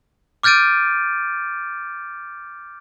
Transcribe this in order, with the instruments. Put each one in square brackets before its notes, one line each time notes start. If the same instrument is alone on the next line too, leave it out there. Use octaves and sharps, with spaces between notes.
[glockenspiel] D6 F6 G6 A6 D7 D#7